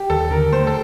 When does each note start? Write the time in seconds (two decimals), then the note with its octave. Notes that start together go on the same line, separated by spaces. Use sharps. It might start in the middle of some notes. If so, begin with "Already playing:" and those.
Already playing: G4
0.10 D#2 A4
0.30 D3 A#4
0.52 A3 C5
0.67 A4